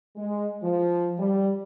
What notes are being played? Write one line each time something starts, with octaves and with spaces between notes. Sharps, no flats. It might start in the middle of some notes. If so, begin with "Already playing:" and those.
G#3
F3
G3